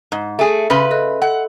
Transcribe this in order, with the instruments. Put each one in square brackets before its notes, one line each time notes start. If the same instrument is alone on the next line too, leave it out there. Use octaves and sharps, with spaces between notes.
[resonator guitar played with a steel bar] G#2
A3 G#4
[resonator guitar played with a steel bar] C#3 B4 [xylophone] E5 B5 C6
[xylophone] A4 D#5 F#6
[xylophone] A4 [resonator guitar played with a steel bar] F#5